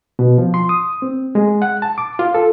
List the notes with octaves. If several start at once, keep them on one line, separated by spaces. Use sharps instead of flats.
B2
F3
C6
D#6
C4
G#3
F#5
A5
D6
F4
A4